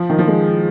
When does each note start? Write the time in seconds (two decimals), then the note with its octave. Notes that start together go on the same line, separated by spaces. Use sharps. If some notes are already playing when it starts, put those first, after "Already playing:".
Already playing: F3
0.10 D#3
0.19 F3
0.28 G#3